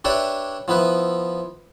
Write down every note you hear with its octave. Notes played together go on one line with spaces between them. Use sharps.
D4 G4 B4 C#5 D5 E5
F3 B3 E4 B4